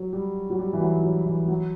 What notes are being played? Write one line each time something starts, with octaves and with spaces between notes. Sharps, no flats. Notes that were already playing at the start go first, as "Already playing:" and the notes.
Already playing: F#3
G3
F#3
G3
E3
F#3
F#3
E3
F#3